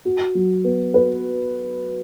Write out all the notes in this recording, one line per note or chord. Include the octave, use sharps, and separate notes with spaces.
F#4
F#3
B3
B4